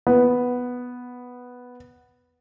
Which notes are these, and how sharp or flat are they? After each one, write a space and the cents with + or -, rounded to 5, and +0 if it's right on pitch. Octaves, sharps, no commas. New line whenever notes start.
B3 +0